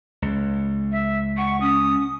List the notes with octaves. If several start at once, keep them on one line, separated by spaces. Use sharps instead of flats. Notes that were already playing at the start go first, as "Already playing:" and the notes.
C#2
E5
F#5 C#6
C#4 D#6